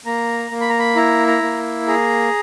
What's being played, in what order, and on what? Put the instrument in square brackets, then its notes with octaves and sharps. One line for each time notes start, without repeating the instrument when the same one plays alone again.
[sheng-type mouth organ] A#3 A#5
A#3
B5
A#5
B5
E4 A#5
A#5
A#3
G#4 A#5